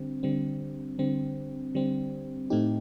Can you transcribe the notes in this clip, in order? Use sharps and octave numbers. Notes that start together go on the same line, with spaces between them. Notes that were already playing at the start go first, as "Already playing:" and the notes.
Already playing: D3 G3 C4
D3 G3 C4
D3 G3 C4
D3 G3 C4
A2 A3 C4 D#4 G4